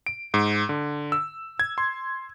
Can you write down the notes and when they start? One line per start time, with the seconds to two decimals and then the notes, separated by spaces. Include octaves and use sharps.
0.06 D7
0.34 G#2
0.69 D3
1.12 E6
1.60 G#6
1.78 C6